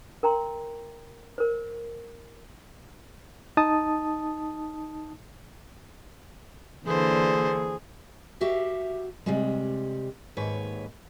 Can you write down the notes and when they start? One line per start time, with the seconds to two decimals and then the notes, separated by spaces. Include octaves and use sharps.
0.23 A#4 G5 A#5 C6
1.38 A#4 C5
3.57 D#4 A5 D#6
6.87 D3 E3 A#3 D4 G#4 C5
8.41 F#4 G4 E5 F5
9.26 C3 G3 G#3
10.37 D#2 G#2 B4 C#5